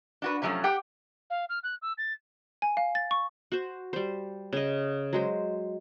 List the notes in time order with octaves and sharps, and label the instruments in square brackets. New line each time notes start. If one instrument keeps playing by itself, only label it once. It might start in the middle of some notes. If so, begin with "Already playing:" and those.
[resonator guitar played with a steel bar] D4 F#4 B4
C3 F3 F#3 G#3 A3 C#4
G4 F#5 G5
[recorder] F5
F6
F#6
E6
A6
[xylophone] G#5
F5
A6
C#6
[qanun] F#4 C5
G3 C5
C#3 D#5
F#3 G#3 C5